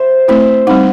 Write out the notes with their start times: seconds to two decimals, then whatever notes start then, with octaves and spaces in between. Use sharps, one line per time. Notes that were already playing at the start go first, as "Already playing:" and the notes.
Already playing: C5 E5
0.28 A3 C4 E4 C5 E5
0.67 G3 C4 D#4 D#5 F#5